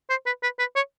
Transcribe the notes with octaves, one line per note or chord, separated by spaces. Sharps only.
C5
B4
B4
B4
C#5